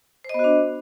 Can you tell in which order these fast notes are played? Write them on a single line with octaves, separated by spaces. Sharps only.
C5 D#5 B3 F#4 D4